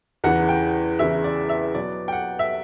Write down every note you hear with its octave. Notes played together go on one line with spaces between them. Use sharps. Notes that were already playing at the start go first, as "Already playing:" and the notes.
E2 C#3 E3 F#5
G5
E2 C#3 E3 E5
D5
E5
B2 F#3 B3 D5
G5
F#5
E5